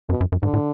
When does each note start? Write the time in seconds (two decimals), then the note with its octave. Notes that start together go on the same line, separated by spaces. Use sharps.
0.09 F#2 B2
0.21 F#2
0.32 F#2
0.43 G#2 D3
0.54 A2